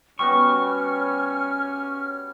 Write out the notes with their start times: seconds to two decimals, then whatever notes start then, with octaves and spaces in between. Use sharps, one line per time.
0.19 G3 B3 C#4 F#4 C#6 F6